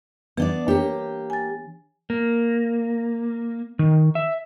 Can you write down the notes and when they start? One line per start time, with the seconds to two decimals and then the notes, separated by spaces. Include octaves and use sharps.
0.37 E3 B3 D4 D5
0.68 A#3 D4 G4 C#5
1.30 G#5 A6
2.10 A#3
3.79 D#3
4.15 E5